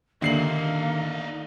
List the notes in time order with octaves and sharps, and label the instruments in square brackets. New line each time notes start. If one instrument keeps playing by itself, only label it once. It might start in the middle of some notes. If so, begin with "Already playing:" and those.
[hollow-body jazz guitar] D#2 A#2 [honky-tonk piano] D3 C7 F#7 [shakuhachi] A#3 [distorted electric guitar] D#4 E5